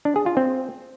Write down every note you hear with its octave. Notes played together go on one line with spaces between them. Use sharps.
D4
G#4
F4
C4